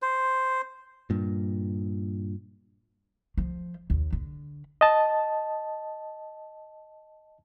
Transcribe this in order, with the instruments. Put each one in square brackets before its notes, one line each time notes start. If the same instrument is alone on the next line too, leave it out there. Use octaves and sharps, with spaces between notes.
[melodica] C5
[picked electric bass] G2 A#2
[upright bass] F3
D#2
D3
[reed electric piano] D#5 A5